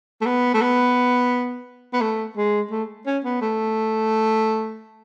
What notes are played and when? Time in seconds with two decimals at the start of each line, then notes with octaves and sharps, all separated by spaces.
0.21 A3
0.26 B3
0.54 A3
0.61 B3
1.93 B3
2.01 A3
2.37 G#3
2.71 A3
3.06 C#4
3.24 B3
3.41 A3